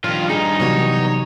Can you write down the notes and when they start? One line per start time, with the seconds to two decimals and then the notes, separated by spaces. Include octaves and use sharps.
0.04 G2 D#3 F3 F4
0.30 D#4 G#4
0.60 C3 E3 F#3 G3 B3 F#4 C#5